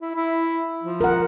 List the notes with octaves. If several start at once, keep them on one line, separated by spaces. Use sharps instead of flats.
E4
E4
F3
A#4 F#5